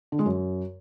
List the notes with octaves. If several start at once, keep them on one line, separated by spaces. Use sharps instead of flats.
D3
G#3
F#2